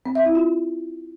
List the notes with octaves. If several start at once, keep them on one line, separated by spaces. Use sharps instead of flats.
C4
E5
E4
F4